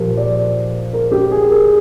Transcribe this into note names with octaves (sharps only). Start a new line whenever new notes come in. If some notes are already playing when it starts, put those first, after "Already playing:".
Already playing: A#2 F3 G4 A#4
D5
A#4
G4
G#4
A#4